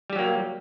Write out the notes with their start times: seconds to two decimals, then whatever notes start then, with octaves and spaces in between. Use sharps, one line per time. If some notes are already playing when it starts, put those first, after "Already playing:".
0.10 G3
0.13 G4
0.16 F#3
0.19 A#3